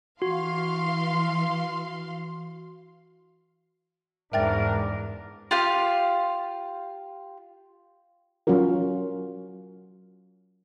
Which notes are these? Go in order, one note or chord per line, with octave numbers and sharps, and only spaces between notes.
E3 F#4 F5 C6
E2 G#2 D4 A#4 E5 G5 A6
F4 G4 F5
F#3 C#4 F4 F#4 A#4